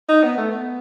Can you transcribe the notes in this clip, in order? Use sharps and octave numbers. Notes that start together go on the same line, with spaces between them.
D#4
B3
A3
B3